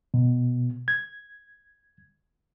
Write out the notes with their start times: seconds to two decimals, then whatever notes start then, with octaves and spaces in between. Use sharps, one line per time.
0.14 B2
0.88 G#6